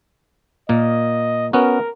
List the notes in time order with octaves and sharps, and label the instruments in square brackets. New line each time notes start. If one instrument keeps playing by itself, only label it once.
[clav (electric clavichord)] A#2 A#3 [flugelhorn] D#5
[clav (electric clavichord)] B3 C#4 F#4 [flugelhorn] A#4